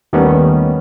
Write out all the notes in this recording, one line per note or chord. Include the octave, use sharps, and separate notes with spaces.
D#2 D#3 G3 A3 B3 C#4